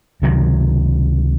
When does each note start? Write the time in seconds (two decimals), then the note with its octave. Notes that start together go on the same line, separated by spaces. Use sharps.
0.22 C#2 C3 D#3 F#3